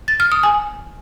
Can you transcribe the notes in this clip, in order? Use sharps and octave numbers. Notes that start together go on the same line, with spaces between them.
A6
F6
D#6
G#5